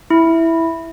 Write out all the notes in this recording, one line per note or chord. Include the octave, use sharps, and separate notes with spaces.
E4